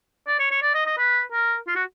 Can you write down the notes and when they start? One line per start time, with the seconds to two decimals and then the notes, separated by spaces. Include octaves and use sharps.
0.27 D5
0.40 C#5
0.51 C#5
0.62 D5
0.74 D#5
0.86 D#5
0.98 B4
1.32 A#4
1.67 F4
1.75 F#4